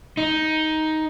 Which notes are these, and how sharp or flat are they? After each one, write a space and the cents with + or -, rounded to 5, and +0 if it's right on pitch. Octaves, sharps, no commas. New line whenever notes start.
D#4 +10